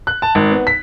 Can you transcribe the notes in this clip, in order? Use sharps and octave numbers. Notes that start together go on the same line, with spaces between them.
F#6
A5
G#1
B3
B6